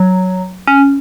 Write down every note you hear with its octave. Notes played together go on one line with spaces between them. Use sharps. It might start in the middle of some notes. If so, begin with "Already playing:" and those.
Already playing: F#3
C#4